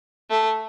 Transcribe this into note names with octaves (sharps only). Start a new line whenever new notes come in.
A3